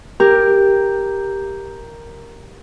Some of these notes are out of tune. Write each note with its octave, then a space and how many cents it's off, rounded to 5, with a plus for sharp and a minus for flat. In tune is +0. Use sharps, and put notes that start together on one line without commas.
G4 +5 A#4 +0